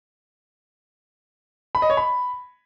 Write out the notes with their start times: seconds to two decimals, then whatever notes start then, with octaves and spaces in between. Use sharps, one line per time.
1.75 B5
1.82 D#5
1.90 C#5
1.97 B5